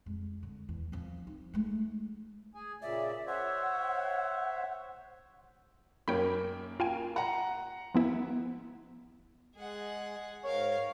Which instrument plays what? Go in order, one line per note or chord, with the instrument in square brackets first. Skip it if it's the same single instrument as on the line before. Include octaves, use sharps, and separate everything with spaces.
[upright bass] F2 G#3
D3
E2
F3 C4
D#4
G#3 A3
[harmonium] G#4 G#5
[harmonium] A#2 C#3 D5 [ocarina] E5
[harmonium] C5 C#5 E5 [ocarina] F#5
[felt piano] F#2 A#3 [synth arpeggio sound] C#5 G5 B5
[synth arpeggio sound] F4 G5 G#5
[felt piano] F#5 A#5
[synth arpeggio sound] F3 B3 E4
[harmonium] G#3 [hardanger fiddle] G#4 F#5
[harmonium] G#2 [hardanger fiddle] A#4 F5 [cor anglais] C#5